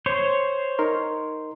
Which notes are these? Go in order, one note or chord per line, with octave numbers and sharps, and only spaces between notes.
C5 C#5
D#4 A#4 C6